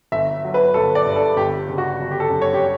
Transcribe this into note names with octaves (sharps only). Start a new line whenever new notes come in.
G1 E5
F#3
B4
G1 A4
D5
G2
A4
G1 G4
C#3
F#4
G1
G4
A4
F#2
C#5
G4
G3